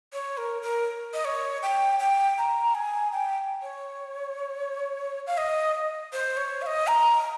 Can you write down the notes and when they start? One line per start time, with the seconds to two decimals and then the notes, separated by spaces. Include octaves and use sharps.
0.13 C#5
0.37 A#4
0.62 A#4
1.14 D#5
1.25 C#5
1.63 G5
1.99 G5
2.38 A#5
2.75 G#5
3.12 G5
3.62 C#5
5.27 F5
5.37 D#5
6.13 C5
6.37 C#5
6.62 F5
6.66 D#5
6.87 A#5